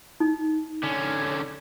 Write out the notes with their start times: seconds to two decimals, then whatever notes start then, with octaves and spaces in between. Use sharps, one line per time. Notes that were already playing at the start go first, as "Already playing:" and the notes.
0.20 D#4
0.83 D3 C#4